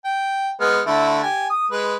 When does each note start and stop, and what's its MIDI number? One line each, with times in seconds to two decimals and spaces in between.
0.05 0.52 79
0.61 0.81 56
0.61 0.81 59
0.61 0.81 89
0.87 1.23 50
0.87 1.23 57
0.87 1.23 64
1.23 1.48 67
1.23 1.48 80
1.50 1.68 87
1.71 1.96 56
1.71 1.96 71